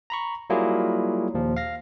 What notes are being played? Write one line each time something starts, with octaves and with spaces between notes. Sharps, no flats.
A#5 B5 C#6
F#3 G3 A#3 E4 F4 G#4
D#2 A#2 F3
F5 A#6